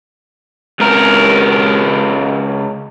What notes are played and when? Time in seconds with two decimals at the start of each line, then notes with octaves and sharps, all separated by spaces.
0.80 C#2 A#4